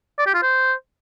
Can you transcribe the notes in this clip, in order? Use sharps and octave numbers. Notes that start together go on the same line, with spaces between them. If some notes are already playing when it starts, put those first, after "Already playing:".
D5
G4
F4
C5